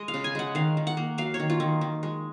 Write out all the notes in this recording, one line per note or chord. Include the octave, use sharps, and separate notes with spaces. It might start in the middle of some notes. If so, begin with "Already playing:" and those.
Already playing: G#3 D#5
F5
C#3
G#5
G#3 F#5
D#3 F5
D#3
F#5
A#3
F#3 F5
C#5
D#3
F4
D#3
D#3
G#3